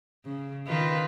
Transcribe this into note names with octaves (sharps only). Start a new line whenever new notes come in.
C#3
D#3 F4 B4